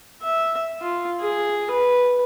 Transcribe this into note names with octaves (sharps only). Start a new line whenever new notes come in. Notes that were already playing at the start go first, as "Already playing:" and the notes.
E5
F4
G#4
B4